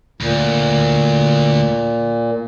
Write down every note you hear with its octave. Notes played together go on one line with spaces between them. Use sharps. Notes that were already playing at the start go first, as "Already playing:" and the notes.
D2 A#2